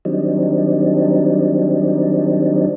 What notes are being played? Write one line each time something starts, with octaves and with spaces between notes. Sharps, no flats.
D#3 F#3 G3 C4 D4 D#4